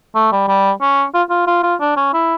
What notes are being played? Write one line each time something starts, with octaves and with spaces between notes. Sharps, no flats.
A3
G3
G3
C#4
F4
F4
F4
F4
D4
C#4
E4